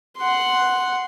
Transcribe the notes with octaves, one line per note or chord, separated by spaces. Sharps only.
F#5 C6